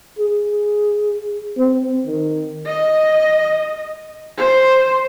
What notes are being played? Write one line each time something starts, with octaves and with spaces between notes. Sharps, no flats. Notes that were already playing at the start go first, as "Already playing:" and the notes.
G#4
C4
D#3
D#5
C5